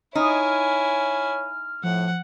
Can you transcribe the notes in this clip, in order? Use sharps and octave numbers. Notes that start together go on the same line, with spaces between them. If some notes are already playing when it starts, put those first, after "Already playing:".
D#4 E4 C#5 G#5 F6
A2 F3 F#5